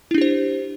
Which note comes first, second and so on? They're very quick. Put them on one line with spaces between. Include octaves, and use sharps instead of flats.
E4 D4 G4 C5